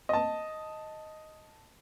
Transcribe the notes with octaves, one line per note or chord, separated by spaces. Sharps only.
D#5 A5